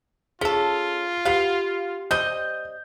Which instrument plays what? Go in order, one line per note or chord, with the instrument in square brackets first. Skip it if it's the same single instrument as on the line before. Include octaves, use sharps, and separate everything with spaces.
[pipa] C#4 A4 [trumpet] F4 [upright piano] G#4
[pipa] B3 F5 [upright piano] G4 C7
[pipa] G3 C4 D#5 [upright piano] G6